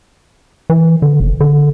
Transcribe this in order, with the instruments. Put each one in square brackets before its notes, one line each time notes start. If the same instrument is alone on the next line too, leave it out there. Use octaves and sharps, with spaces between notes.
[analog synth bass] E3
D3
F#1
D3